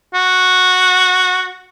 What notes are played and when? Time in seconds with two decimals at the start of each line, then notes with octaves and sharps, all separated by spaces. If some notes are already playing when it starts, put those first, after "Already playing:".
0.14 F#4